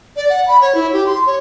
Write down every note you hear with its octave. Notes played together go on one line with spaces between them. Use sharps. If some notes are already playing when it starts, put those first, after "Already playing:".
D5
F#5
B5
C#5
E4
G4
C6
C#5